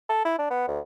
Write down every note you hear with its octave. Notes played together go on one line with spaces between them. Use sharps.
A4
E4
D4
B3
D2